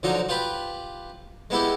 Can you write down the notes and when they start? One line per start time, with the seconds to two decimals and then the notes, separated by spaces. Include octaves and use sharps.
0.03 D3 F3 F#3 D#4
0.29 F4 G4 B4 B5
1.50 G#3 B3 E4 G4